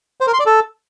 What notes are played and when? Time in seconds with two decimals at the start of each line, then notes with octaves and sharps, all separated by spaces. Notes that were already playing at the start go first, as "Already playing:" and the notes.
0.21 C5
0.27 A#4
0.33 C6
0.40 D5
0.46 A4